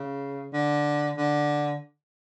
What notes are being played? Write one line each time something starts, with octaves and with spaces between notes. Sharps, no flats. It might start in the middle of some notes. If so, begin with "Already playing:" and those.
Already playing: C#3
D3
D3